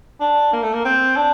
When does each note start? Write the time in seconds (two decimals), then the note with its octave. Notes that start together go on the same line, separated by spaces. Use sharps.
0.20 D4
0.53 A#3
0.63 A3
0.73 A#3
0.85 C4
1.16 D4